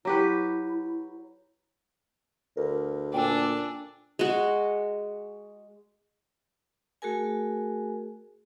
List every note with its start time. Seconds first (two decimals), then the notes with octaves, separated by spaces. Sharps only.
0.05 F#3 E4 G4 B4
2.57 D2 A#4
3.14 A#2 D4 G5 G#5 E6
4.19 G#3 F#4
7.02 A3 F#4 G#4 A#4 G#5